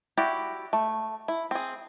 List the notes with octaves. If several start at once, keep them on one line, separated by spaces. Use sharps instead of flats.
E4 F#4 G4 D5
A3
E4
C4 G#4